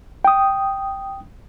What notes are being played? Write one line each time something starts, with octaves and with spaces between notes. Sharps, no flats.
G5 D#6